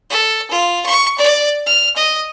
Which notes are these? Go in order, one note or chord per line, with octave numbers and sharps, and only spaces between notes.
A4
F4
C#6
D5
F6
D#5